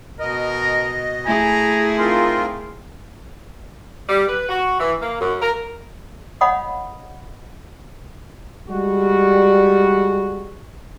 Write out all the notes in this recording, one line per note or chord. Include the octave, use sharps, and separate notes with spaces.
B2 A#4 D#5
A3 E4 G#4 G#5 A#5
C4 D#4 F4 A#4 C6
G3
B4
F#4
E3
A#3
F#2
A#4
C#5 D#5 F5 F#5 B5 D#6
G3 G#3 F#4